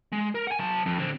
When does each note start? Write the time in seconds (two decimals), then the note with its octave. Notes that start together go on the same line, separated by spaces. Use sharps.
0.12 G#3
0.35 A#4
0.47 F#5 G#5
0.60 F#3 A5
0.86 F2
0.98 D3 C4